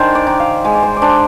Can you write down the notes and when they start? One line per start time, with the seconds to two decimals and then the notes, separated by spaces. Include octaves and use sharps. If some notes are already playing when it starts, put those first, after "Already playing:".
Already playing: D#3 D4 C5 G#5
0.15 D5
0.27 D#3
0.40 F5
0.64 G#3 G#5
0.75 D5
0.83 C5
0.96 D5
1.02 D4 C5